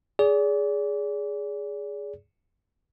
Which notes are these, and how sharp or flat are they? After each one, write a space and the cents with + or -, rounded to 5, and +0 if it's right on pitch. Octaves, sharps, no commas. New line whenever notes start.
G#4 +0 D5 -35